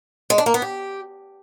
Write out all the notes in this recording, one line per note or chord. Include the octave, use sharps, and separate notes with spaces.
G#3
D4
A#3
B3
G4